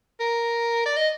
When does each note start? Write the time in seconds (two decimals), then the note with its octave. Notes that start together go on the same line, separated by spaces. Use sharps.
0.20 A#4
0.86 D5
0.97 D#5